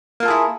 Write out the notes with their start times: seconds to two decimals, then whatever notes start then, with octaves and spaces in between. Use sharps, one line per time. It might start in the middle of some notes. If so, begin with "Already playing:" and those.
0.20 A#3
0.23 F4
0.25 A4
0.28 G#4
0.30 E4